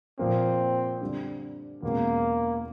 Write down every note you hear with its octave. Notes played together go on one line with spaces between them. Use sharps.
A#2 F3 A#3 C4
D3 G3 C4
E2 B2 G#3 A#3 C#4